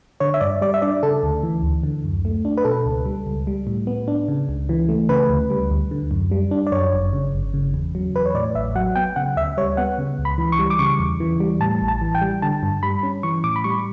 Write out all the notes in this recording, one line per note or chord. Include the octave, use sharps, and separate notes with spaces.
D3 C#5
E5
G2 D5
G3 D5
E5
D4 D5
C#3 A4
D2
E3
D2
D3
F#2
A3
D4
B4
B2 A4
C#2
G3
C#2
G3
A2
B3
D4
C#3
C#2
E3
A3
C#3 B4
D2
G3
D2
D3
F#2
G3
D4
D5
F#2 C#5
G1
C#3
G1
C#3
E2
F#3
E2 B4
C#5
A2 D5
A1 E5
F#3 F#5
B3 G5
C#3 F#5
D2 E5
G3 C#5
B3 F#5
C#3
C#2
B5
E3
C#6
G3
D6
C#3 C#6
E2
E3
G3
A2 A5
A1
A5
E3
G5
G3
D3 A5
G2
G3 B5
C#4
E3 C#6
A2 D6
B5
G3 C#6